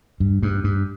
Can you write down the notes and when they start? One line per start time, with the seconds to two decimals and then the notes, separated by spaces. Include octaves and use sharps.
0.20 G2
0.42 G2
0.64 G2